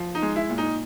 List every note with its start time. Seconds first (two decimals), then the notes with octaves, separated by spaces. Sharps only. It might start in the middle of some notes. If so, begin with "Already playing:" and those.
Already playing: F3
0.15 D#4
0.22 G#3
0.36 E4
0.50 A#2
0.58 D#4